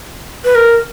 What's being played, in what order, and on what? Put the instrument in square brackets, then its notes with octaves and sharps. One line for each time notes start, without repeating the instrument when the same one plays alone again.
[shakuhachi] B4
A#4